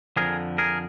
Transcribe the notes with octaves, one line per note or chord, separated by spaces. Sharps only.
F2 D3 F3 G#4 A#4
G#4 A#4